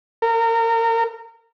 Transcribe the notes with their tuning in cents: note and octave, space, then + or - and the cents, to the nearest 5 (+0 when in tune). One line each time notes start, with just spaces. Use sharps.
A#4 -30